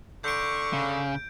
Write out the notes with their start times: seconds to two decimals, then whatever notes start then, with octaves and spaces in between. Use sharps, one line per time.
0.24 D3 C#6 G6 D7
0.73 C#3